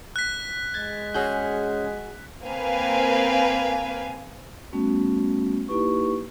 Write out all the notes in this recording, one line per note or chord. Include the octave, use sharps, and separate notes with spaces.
F#6 B6
G#3 G#6 A6
C#4 F#4 G#4 G6
A#3 C4 B4 F5 G#5
G3 A3 B3 C#4 F#4
A#3 D#4 E4 G4 B4 C#6